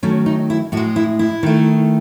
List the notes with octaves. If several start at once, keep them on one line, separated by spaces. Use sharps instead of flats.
D#3 F#3 A3 C#4
D#4
E4
A2 F#4
G#3
E4
E4
D#3 A3